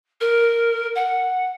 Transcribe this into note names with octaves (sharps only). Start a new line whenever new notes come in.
A#4
F#5